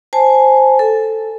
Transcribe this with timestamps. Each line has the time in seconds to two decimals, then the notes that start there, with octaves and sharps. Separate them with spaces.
0.13 C5 G#5 A5
0.79 A4